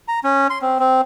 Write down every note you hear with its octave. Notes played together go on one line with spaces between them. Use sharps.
A#5
C#4
C6
C4
C4